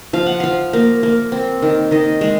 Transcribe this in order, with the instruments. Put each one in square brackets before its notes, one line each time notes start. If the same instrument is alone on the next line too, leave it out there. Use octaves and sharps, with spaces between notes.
[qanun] F3 F5
F#5
F3 F5
A#3
A#3
C4
D#3
D#3 D#5
G#3